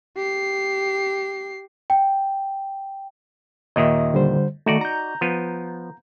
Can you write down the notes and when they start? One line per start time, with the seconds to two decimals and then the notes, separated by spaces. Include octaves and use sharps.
0.16 G4 C7
1.90 G5
3.76 D#2 A#2 D#3 D#5 E5 D#6
4.14 D3 G3 C5
4.66 D#3 A3 D#4 F#4 D5
4.81 A#5 G6
5.21 F3 B3